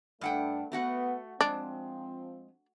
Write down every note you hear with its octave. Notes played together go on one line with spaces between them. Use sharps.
G2 A3 D4 F#5 G5
A3 B3 F#4 F#5
F3 G#3 C4 D4